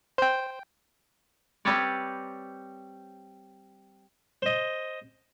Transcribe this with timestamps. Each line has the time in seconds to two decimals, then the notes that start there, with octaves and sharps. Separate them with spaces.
0.18 C5 G5
1.65 G3 C4 B4 C#5 D5
4.42 C5 D#5